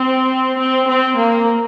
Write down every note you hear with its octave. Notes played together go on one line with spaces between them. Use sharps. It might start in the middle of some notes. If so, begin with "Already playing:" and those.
Already playing: C4
C4
C4
A#3